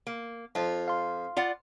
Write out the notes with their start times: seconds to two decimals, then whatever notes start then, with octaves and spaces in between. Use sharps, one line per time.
0.07 A#3
0.55 F2 F4
0.88 F5 C6
1.37 F4 D5 F#5